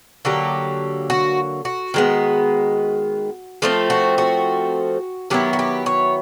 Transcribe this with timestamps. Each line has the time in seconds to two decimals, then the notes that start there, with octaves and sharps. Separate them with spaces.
0.25 D3 F#3 A#3 G4
1.10 F#4
1.65 F#4
1.94 D#3 G#3 B3
3.62 F3 A3 C4 F4
3.90 F#4
4.18 F#4
5.30 D#3 F#3 B3 E4 G4
5.53 F#4
5.59 G4
5.86 C#5